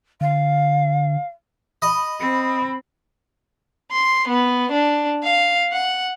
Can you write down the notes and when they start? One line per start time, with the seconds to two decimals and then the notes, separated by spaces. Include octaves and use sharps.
0.21 D3 F5
1.82 D#5 B5
2.20 C4
3.93 C6
4.28 B3
4.72 D4
5.24 F5
5.73 F#5